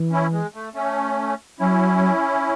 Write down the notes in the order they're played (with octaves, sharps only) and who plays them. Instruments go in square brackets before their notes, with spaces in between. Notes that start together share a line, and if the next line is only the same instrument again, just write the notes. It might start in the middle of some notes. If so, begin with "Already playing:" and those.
Already playing: [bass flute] E3
[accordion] C#4 E4
G#3
A3
A3 C#4
[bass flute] F#3 [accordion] C#4 E4